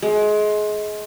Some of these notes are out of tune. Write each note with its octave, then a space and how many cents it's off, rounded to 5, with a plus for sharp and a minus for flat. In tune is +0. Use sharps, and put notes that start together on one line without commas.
G#3 +25